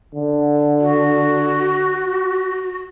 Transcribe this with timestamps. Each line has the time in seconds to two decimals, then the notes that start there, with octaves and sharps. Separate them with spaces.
0.15 D3
0.80 F#4